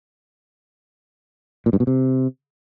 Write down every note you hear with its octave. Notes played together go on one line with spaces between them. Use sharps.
A#2
G2
B2
C3